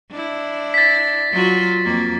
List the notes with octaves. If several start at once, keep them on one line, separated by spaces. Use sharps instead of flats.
D4 E4
A6 B6
F#3 F4 F#4
F2 A#3